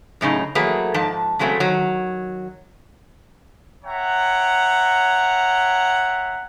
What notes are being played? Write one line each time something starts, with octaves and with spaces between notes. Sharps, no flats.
F#2 A2 C#3 D#4
E3 F#3 A3 A#3 G#4 B4
G#2 F3 A5
C#3 F#3 G#3 A3 C4
D#3 F#3
C#5 E5 F#5 G5 A#5